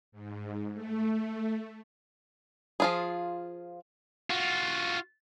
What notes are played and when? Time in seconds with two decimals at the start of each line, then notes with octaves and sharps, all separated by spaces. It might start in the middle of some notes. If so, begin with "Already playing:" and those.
0.12 G#2
0.73 A3
2.80 F3 F4 G#4
4.30 F4 F#4